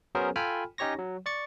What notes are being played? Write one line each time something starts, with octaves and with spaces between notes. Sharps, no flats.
F#3 B3 C#4 G#4 A#4 C5
F4 A4 G5 G#5 B5 F6
C#4 D#4 G4 C#5 C#6 A#6
F#3
D5 C#6 A6 C#7